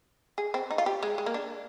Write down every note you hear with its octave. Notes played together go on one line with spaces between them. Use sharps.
G#4
C4
D#4
F4
G4
G#3
G#3
A#3
D4